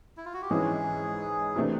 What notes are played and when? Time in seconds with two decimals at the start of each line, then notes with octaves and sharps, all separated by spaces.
0.17 E4
0.25 F4
0.34 F#4
0.42 G4
0.50 G#2 E3 G#3 C#4 E4 G#4
1.56 C3 E3 A3 D4